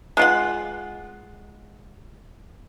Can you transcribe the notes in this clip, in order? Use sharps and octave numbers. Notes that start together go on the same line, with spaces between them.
G#3 F4 F#5